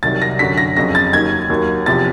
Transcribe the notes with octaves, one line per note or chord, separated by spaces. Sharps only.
C2 C3 D#3 F#3 A6
A#6
F#2 D3 F#3 B6
A#6
F2 C#3 F#3 A#6
A6
D#2 D#3 F#3 G#6
D#2 D#3 F#3
E2 C3 F3 A6